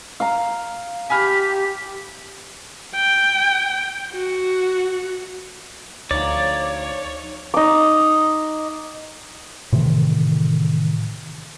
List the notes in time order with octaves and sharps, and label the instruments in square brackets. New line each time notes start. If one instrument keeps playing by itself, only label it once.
[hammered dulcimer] F5 A#5
[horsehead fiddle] G4 [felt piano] G#5 B5 F6 [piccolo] B6
[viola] G5
F#4
[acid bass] D2 [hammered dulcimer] F3 D#4 [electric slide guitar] C#5 [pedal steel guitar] D5
[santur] D#4 D6
[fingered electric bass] A2 C3 D#3 E3